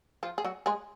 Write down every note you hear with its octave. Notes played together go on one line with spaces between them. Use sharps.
F3 F4
G#4
F#3 F#4
G#3 G#4